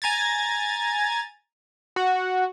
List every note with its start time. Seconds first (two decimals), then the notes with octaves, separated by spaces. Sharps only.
0.02 G#5 A#5 G#6 A6
1.96 F#4